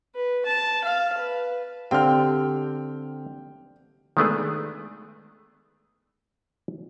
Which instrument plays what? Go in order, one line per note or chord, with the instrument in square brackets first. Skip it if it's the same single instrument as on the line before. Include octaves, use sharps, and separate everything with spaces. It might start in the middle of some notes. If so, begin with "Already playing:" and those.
[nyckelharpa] B4
A5
F5
B4
[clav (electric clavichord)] D3 C4 F5 [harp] G4 [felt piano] G5 F6
[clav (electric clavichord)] D#3 G#3 A3 B3 D4 G#4